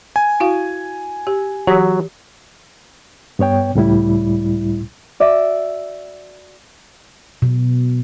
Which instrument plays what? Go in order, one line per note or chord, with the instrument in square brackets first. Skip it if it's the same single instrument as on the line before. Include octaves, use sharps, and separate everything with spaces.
[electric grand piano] G#5
[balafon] E4 F#4 F5
G4
[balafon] E3 G4 [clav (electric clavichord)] F#3
[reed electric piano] G2 B3 C#5 G5
C#2 A2 G3 E4
[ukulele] F#4 D5 E5
[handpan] B2